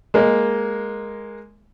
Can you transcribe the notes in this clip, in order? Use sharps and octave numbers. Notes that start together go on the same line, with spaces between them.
G#3 A#3